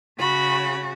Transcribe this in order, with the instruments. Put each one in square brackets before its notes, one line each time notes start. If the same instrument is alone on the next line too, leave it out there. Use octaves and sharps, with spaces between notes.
[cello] C#3 F#4 [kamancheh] B5